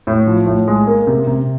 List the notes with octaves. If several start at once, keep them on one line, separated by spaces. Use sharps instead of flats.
A2
F3
A2
G#3
A#3
C3
C3